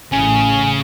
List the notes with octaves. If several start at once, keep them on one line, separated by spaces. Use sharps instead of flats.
A1 A2 C#3 G#5